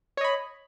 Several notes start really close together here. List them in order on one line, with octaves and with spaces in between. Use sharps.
C#5 D#5 B5